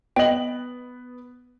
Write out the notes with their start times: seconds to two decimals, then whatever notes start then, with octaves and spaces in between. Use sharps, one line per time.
0.16 B3 D#5 G5 F#7